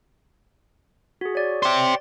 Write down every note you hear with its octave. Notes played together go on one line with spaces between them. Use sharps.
F#4 G#4
C#5 D5
G4 C5